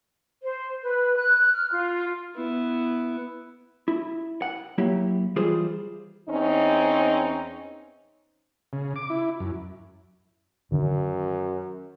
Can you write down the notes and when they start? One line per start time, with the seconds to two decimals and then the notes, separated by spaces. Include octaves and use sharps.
0.42 C5
0.82 B4
1.16 F#6
1.52 F6
1.71 F4
2.36 B3 E4
3.88 E4
4.42 F#5
4.78 F#3 A#3 E4 G4
5.36 E3 G3 F4 G#4 C5
6.29 E2 C4 C#4 D#4
8.73 C#3
8.96 D6
9.10 E4
9.40 F#2
10.72 F#2 D3 D#3